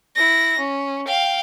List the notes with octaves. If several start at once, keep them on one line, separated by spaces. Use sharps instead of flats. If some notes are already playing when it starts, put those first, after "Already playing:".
E4 A#6
C#4
F5 G5